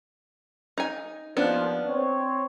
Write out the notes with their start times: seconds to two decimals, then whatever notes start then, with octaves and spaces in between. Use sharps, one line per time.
0.78 D#4 G#5
1.37 D#2 F3 B3 D4
1.86 C4 C#5